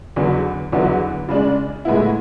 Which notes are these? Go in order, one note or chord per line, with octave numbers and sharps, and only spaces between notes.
E2 D3 F#3 B3
E2 D3 F#3 B3 E4
C#3 G#3 D4
A2 G#3 B3 E4